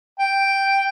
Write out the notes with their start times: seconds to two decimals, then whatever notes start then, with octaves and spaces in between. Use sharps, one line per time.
0.19 G5